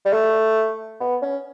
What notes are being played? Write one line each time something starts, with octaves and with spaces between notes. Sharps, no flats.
G3
A3
B3
C#4